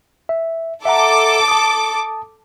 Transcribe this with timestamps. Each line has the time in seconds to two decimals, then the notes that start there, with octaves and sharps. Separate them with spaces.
0.29 E5
0.85 A4 E5 F#5 A#5 D6
1.48 A5 D#6